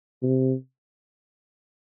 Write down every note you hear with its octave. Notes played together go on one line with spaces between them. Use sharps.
C3